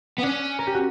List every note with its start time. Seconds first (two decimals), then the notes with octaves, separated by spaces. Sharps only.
0.18 B3
0.23 C#4 D4
0.59 A#4
0.67 G4
0.74 F#4